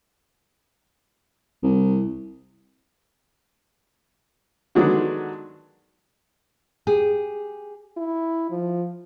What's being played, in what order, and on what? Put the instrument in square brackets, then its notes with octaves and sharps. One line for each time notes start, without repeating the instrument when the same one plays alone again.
[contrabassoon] C2
[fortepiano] D3 D#3 F#3 G#3 B3 D4
[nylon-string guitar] G4 G#4
[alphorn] E4
F3